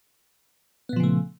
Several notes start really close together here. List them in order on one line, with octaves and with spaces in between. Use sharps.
B3 A#2 F3 C#3 A3